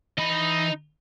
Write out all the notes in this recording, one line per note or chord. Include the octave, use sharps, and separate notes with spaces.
E3 D#4 D#5 B5